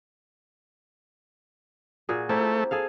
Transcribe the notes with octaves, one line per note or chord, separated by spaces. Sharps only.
A#2 F#4 G#4
A3 A#3 C4 E4
G#4 A4 F5